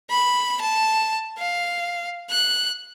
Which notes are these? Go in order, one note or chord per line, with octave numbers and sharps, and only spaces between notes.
B5
A5
F5
F#6